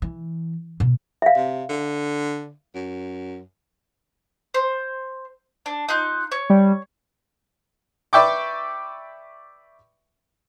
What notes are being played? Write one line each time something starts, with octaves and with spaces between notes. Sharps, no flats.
E3
B2
E5 F5
C3
D3
F#2
C5
D4
D#4 F4 F#6
C#5
G3
B4 D5 E5 G5 C#6 D6